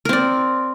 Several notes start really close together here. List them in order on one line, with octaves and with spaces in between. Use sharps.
A#4 C4 D5